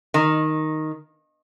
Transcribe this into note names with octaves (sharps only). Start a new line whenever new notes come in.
D#3